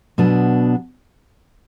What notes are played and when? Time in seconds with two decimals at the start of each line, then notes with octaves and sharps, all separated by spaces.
0.18 B2 F#3 B3 D4